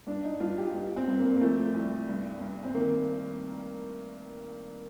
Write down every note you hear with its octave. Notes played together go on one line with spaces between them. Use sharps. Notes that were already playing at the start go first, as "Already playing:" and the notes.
G2 D4
D#4
G2 F4
G4
G2
C4
G2
A#3
A#3
F3 A3
C2
G2
G2
C4
D#3 A#3